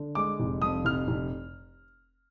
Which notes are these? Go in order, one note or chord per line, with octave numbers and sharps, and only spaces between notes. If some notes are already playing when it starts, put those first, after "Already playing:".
Already playing: D3
G#3 D6
F1
F2 D#6
F1 F6
F1